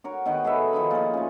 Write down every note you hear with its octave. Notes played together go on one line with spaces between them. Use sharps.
F#4 A#4 C#5
B2 D#3 F#5 G5
G#4 A4 B4 E5
D#3 F3 D#4 B5
A#2 F3
A3 C#4